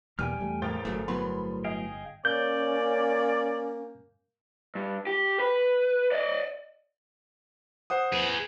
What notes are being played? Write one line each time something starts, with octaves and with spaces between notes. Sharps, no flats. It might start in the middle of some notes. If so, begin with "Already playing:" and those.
E2 G2 B2 A#3 G5 G#5 F6
E2 G3 A3
A1 G#4 A#4 C5 G5 A6
G1 F#3 A3
A2 F#3 B3 B5 C6
G#4 D#5 F5 G5
A#3 C#4 D5 G6
G2
G4
B4
D5 D#5
C5 F#5 D#6
G#4 B4